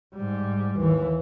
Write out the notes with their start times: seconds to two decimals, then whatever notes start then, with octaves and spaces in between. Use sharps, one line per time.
0.16 G#2 G3
0.78 D#2 E3